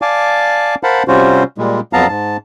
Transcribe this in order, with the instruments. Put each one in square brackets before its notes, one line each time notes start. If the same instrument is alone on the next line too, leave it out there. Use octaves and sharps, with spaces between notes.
[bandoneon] D5 F5 G#5 A5 D6
A#4 C5 F5 F#5 A5 B5
C3 G3 C#4 F4 F#4 C5
A#2 G3 G#3
F2 F#3 B3 F5 A5 A#5
G#2 A5